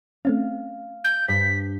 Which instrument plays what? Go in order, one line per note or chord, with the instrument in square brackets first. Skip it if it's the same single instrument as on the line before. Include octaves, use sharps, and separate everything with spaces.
[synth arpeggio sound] A3 C4 C#4 [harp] F5
[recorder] G6
[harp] G2 [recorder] B6